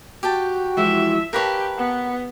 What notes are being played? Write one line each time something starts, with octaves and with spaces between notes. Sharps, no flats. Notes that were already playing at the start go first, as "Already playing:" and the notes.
F#4 G4 G5 A5
E3 F3 G#3 E5
G4 A#4 B4 C#5 F5 A5
B3 F#5